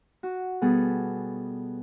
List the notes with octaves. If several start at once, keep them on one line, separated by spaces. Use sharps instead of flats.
F#4
B2 G3 B3 G#4 A4